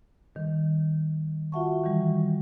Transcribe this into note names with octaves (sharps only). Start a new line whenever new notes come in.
D#3 G3
F4 F#4 E5 F#5 A5 C#6
D#3 E3 G3